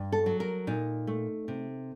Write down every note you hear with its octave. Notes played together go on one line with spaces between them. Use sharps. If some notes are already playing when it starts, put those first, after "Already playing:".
Already playing: G2
A4
F#3
A#4
A#2 D#4
A3
C3